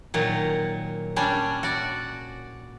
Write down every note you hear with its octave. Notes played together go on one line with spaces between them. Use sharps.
A#2 D#3 F#3
G3 C#4 D4
F#4 D5